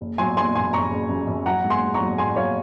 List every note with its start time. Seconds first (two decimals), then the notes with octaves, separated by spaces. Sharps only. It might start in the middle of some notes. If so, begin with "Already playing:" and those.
0.01 F#1
0.18 F#3 G#5 C6
0.37 F#1 G#5 C6
0.55 F#1 G#5 C6
0.73 F#1 A#5 C#6
0.92 C#3
1.09 F#2
1.27 F#2
1.46 F#3 F#5 A#5
1.64 G#2
1.70 G#5 C6
1.82 G#2
1.94 A#5 C#6
2.01 F#3
2.18 G#2 G#5 C6
2.36 F#3 C#5 F5